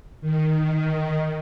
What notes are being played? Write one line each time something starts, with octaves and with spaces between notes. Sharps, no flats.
D#3